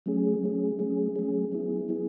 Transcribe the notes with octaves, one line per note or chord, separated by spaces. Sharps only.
F#3 A3 C#4 G#4
F#3 A3 C#4 G#4
F#3 A3 C#4 G#4
F#3 A3 C#4 G#4
F#3 B3 E4 G#4
F#3 B3 E4 G#4